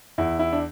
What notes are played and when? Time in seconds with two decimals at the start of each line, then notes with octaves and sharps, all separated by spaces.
0.18 E2 E4
0.39 E4
0.53 D4